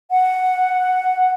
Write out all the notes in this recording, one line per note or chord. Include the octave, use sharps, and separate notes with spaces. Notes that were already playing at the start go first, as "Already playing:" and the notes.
F#5